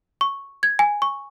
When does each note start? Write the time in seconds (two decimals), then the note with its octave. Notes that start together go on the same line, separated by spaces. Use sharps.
0.21 C#6
0.63 G#6
0.79 G#5
1.02 C#6